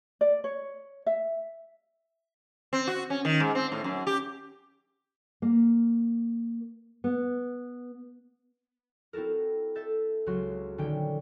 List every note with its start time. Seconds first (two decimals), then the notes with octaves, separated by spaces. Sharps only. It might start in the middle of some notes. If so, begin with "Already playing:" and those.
0.21 D5
0.44 C#5
1.06 E5
2.73 C4
2.87 F#4
3.10 C#4
3.25 D#3
3.40 G#2
3.55 C4
3.72 A2
3.84 F#2
4.07 G4
5.42 A#3
7.04 B3
9.13 C4 E4 F#4 A4 A#4
9.75 A4 E5 G6 A6
10.26 C#2 F#3 F#4 C6
10.78 A#1 D3 D#3 C#4 G5